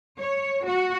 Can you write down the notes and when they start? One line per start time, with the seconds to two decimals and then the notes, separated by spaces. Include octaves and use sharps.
0.18 C#5
0.66 F#4